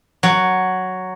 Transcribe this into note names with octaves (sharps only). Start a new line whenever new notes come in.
F#3